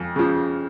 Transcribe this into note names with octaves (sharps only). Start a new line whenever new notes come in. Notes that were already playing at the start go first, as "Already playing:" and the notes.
Already playing: F2
C#3 F3